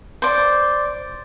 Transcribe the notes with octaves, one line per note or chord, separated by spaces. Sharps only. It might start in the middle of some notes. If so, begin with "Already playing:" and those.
C5 D5